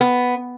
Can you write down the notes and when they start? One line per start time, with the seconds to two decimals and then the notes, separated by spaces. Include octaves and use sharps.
0.01 B3